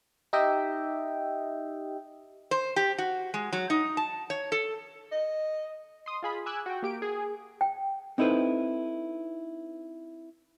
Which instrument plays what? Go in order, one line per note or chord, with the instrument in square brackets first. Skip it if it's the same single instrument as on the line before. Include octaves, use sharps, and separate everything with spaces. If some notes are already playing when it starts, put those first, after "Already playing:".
[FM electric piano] D#4 G4 D#5 E5 G5
[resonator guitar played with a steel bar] C5
G4
F#4
G#3
F#3
D#4
A5
C#5
A4
[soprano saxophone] D#5
[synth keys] C6 D#6
F4 G#4 B5
G#5 D6 E6 F#6 G#6
F#4 G5
A#3 G4 D7
G#4
[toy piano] G5
[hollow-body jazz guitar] C4 D#4 E4 A4 B4 C5